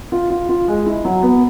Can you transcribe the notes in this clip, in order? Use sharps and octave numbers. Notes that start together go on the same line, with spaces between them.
F4
F4
F4
G#3
E4
F#3
B3